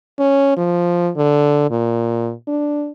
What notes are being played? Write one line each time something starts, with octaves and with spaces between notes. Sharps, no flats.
C#4
F3
D3
A#2
D4